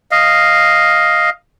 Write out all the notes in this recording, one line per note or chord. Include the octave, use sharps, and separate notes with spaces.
D#5 F5